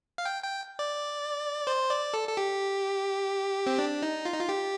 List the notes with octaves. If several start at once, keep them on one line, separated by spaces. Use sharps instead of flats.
F5
G5
G5
D5
C5
D5
A4
A4
G4
C4
D4
D#4
F4
D#4
F4
G4